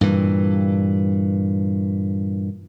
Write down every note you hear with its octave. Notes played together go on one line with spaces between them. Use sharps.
G2 A#2 E3